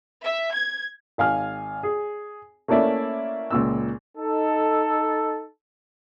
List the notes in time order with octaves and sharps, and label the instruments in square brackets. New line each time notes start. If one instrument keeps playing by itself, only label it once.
[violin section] E5
G#6
[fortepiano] G#1 F5 G#5 F6
G#4
A3 A#3 C#4 E4 D5 E5
C#2 A#2 E6
[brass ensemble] D#4 A4